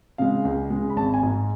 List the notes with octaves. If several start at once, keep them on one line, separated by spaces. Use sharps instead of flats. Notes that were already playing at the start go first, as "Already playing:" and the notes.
C#3 G#3 F5
C#2
G#3
C#3
B5
G#1 A5
G#5
G#2 G#3